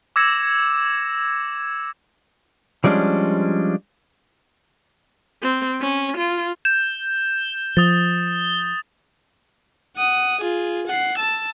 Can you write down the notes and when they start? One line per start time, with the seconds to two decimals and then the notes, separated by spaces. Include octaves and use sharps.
0.16 D6 E6 G#6 A#6 C#7 E7
2.84 F3 G3 G#3 C#4 D4
5.43 C4
5.81 C#4
6.17 F4
6.65 G6 E7
7.77 F3 D#6 A6
9.97 F#5 D#6
10.41 F4 G#4
10.87 F#5 C7
11.18 A5 E6